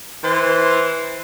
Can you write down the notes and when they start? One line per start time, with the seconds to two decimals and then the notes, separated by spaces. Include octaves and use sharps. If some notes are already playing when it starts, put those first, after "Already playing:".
0.24 E3 C5